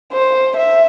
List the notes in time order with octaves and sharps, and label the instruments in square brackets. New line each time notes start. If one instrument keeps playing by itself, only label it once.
[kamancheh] C5
E5